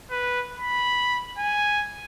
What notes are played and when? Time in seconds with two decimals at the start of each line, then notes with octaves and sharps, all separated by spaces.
0.11 B4
0.59 B5
1.38 G#5